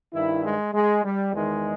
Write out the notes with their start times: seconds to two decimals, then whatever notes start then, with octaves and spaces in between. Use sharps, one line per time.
0.14 G2 D#3 E4
0.44 G#3
0.74 G#3
1.03 G3
1.33 E2 D#3 G#3